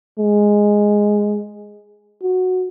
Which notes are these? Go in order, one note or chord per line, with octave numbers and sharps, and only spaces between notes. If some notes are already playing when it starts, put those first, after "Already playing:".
G#3
F#4